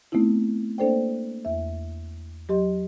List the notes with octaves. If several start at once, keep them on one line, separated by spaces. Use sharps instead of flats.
A3 B3 C4 D#4 E4
A#3 D4 A4 C5 D5 G5
E2 E5
F#3 G4 D#5 C6